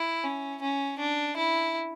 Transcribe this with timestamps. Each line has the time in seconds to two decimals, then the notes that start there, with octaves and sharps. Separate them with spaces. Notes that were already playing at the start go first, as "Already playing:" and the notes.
Already playing: E4
0.24 C#4
0.62 C#4
0.99 D4
1.37 E4